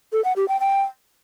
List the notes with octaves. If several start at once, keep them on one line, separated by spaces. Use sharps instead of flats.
A4
F#5
G4
G5
G5